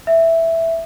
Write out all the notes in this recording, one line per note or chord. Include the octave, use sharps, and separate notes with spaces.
E5